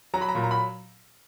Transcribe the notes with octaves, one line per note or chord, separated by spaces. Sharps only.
F#3 A#5
B5
A#5
A#2 B5
A#5
B5